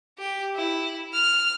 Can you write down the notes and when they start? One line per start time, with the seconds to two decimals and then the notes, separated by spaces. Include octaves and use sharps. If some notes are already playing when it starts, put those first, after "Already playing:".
0.18 G4
0.55 E4
1.13 F6